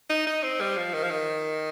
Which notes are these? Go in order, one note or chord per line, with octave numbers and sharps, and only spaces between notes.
D#4
D#4
C4
G3
F3
D#3
F3
D#3